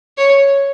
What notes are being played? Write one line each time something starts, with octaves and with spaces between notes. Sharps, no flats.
C#5